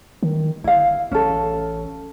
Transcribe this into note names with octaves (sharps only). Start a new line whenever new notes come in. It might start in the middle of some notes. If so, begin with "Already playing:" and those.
D#3
G1 E4 F5
A1 C#4 A4